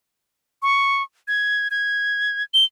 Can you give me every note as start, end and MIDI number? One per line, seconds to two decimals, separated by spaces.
0.62 1.03 85
1.28 1.68 92
1.71 2.43 92
2.54 2.64 103